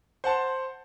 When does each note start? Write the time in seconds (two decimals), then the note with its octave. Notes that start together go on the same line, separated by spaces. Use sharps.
0.24 C5 F#5 A5 C6